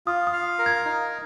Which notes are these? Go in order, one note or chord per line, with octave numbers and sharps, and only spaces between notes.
F4 D#6
D#6
F5
A#4
G#6
D#4